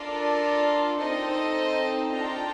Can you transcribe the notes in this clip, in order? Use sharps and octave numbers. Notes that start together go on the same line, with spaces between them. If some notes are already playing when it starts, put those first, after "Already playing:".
Already playing: D4 F4 A4 A#4 D5
C4 D#4 A4 C5 D#5
D4 F4 A4 G5 A#5